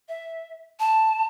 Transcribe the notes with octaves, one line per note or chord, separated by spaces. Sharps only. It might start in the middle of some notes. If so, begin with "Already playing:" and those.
E5
A5